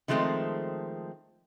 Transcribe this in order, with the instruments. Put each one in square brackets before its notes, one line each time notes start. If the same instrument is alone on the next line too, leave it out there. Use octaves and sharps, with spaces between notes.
[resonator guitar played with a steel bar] D#3 F3 G#3 A3 C4